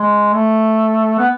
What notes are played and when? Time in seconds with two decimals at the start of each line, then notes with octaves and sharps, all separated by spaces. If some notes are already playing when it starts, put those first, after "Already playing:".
Already playing: G#3
0.33 A3
1.18 B3